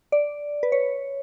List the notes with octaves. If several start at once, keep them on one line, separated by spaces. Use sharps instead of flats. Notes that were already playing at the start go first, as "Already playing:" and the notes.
D5
B4
C#5